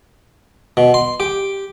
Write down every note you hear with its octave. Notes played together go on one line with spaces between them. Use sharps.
B2
C6
G4